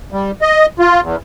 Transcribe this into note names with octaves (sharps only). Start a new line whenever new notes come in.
G3
D#5
F4
E2